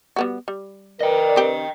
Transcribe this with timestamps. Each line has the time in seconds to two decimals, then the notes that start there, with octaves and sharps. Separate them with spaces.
0.16 G3 B3 F#4
0.48 G3
1.00 A#4 B4 D5 D#5 G5
1.36 C4 G4